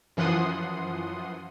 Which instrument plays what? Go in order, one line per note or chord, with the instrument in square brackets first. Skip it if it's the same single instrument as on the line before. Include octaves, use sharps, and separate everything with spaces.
[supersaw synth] F#2 E3 F3 F#5 C6 D#6